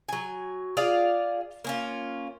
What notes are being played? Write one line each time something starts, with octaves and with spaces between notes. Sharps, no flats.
F#3 G#5
F4 G#4 D5 F5
A#3 C#4 F4